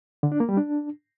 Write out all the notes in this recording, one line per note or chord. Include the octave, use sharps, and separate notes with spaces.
D3
D4
A#3
G3
D4